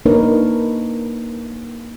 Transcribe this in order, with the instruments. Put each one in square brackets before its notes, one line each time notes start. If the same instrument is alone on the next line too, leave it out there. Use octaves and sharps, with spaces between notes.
[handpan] A#3 D4 D#4 A#4 B4 C#5